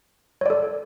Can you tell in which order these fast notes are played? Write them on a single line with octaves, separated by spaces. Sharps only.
C#5 D5 A4